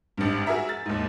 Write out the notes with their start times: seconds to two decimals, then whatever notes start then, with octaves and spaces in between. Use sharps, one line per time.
0.17 G#1 G2
0.46 F#4 G#4 A#4 E5 A#5
0.69 A6
0.86 D#2 G#2